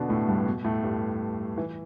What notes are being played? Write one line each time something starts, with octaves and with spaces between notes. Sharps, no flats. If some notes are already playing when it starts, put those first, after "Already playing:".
Already playing: B2 D3 B3 D4
A2 A3
G2 G3
B2 B3
A2 A3
G2 G3
E3